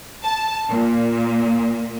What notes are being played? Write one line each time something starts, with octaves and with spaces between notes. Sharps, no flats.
A5
A#2